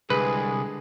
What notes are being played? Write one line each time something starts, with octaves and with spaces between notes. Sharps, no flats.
C2 D3 G#3 G#4 B4